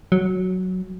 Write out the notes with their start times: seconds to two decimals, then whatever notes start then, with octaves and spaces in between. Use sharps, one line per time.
0.12 F#3